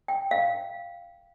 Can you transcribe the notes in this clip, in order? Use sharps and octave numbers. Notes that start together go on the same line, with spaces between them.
G5
F5